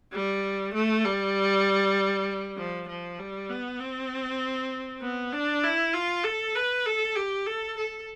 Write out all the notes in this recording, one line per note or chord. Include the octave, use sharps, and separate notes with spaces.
G3
A3
G3
F3
F3
G3
B3
C4
B3
D4
E4
F4
A4
B4
A4
G4
A4
A4